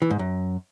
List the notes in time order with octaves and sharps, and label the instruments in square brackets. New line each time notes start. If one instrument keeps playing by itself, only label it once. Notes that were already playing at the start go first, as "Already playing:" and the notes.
[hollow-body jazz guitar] E3
G#2
F#2